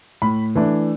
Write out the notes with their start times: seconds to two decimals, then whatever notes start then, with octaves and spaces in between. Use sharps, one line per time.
0.22 A2 B5
0.55 E3 A3 D4